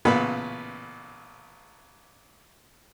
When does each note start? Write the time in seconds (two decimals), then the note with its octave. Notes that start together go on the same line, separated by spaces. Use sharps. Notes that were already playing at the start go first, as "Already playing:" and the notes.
0.05 A1 A#2 C#3 B3 B4 B5